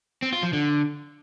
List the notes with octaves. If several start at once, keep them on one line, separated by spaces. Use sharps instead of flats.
C4
F4
F3
D3